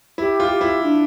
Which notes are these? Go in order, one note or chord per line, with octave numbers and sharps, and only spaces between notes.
E4 G4
F4
G4
E4
D4